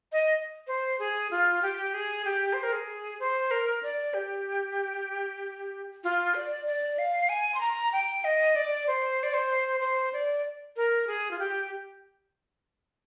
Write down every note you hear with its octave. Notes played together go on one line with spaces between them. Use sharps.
D#5
C5
G#4
F4
G4
G#4
G4
C5
A#4
G#4
C5
A#4
D5
G4
F4
D5
D5
F5
G#5
C6
A#5
G5
D#5
D5
C5
D5
C5
C5
D5
A#4
G#4
F4
G4